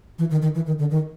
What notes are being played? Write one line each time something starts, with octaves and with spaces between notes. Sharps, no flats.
E3
D#3
D#3
E3
D#3
D3
D#3